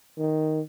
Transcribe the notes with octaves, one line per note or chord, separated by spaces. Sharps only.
D#3